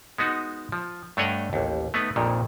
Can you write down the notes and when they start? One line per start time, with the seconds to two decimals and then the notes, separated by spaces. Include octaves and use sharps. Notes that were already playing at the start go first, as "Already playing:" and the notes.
0.18 G#3 B3 D#4 F#4
0.72 F3
1.17 G2 A3 D4 C#5 D#5 F#5
1.53 A1 D#2
1.94 A3 B3 D#4 B4
2.16 A#1 F2 A#2 D#3